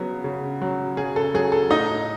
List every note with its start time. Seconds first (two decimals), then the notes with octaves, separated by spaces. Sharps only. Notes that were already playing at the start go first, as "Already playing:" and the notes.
Already playing: C#3 F#3 B3
0.24 C#3
0.61 F#3
0.97 C#3 G#4
1.16 A4
1.34 F#3 G#4
1.52 A4
1.70 A2 D#4 D#5